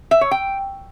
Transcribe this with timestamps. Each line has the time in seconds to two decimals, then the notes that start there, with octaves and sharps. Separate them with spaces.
0.11 E5
0.21 C#5
0.31 G5